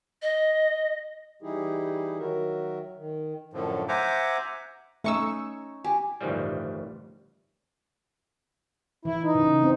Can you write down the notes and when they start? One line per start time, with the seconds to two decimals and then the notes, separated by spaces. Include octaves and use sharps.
0.22 D#5
1.42 E3 G3 D#4 E4 G4 G#4
2.18 D#3 F#3 F#4 A#4 E5
2.97 D#3
3.53 F#2 A2 D3 F3
3.88 C5 E5 F#5 G#5 A#5 D6
5.04 A3 C#4 D#4 C#6 E6
5.84 G4 G#5
6.21 A1 D2 G2 D#3 F3 G3
9.05 E3 E4
9.23 D#4
9.35 C#3
9.63 C4